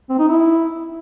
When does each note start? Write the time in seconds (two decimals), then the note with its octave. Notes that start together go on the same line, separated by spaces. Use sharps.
0.09 C4
0.19 D#4
0.28 E4